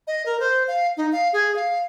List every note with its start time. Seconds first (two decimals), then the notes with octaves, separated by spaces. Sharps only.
0.07 D#5
0.26 A#4
0.40 C5
0.68 F5
0.97 D#4
1.12 F5
1.33 G#4
1.56 F5